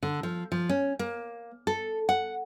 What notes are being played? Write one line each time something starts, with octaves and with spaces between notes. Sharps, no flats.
D3
F3
F3
C#4
A#3
A4
F#5